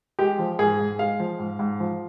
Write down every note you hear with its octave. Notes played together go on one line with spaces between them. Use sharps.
G#3 G4
F3
G#2 G#4
G#2
G#3 F5
F3
G#2
G#2
F3